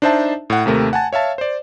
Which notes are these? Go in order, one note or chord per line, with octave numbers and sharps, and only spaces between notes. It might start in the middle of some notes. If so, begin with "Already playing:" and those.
D4 D#4 C5 D#5 E5 A5
A2 F#5
D#2 C3 A3 A#4
F#5 G#5 A5
C#5 E5 F5 A5
C5 D5